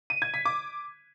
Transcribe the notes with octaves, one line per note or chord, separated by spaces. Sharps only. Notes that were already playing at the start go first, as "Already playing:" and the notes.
D#7
G#6
B6
D6